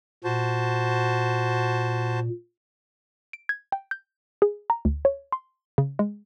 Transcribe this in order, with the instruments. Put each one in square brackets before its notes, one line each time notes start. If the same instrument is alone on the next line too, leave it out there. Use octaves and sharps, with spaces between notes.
[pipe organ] A#2 [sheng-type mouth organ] F#4 C5 A5
[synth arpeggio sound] D7
G#6
G5
G6
G#4
A#5
D2
C#5
C6
C#3
G#3